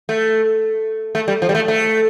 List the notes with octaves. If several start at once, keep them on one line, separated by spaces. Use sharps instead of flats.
A3
A3
G3
F3
G3
A3
A3